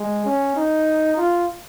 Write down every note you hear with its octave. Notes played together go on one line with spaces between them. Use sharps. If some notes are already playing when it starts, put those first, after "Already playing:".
Already playing: G#3
C#4
D#4
F4